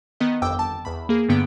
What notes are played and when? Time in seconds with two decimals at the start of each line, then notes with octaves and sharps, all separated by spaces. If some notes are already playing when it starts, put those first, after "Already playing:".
0.20 D#3 B3 D#5
0.42 G1 F2 G5 D6 E6
0.59 A5
0.85 E2 B5
1.09 A#3 G#4
1.29 G2 D3 B3 G5 D7